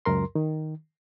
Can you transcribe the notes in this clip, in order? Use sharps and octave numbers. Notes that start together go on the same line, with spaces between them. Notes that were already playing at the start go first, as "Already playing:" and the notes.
C#2 F#2 A#4 C6
D#3